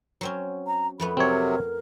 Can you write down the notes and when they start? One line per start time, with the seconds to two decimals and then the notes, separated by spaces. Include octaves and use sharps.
0.21 F#3 C4 C#4
0.67 A#5
1.00 F2 A3 B3 B5
1.17 C3 F#3 C4 A#4 C#5